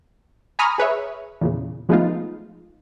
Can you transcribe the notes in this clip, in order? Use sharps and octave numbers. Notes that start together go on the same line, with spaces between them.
G#5 A#5 B5 C#6 D#6 F6
G#4 B4 C#5 E5
E2 A#2 C#3
F3 G#3 A3 B3 D#4 F4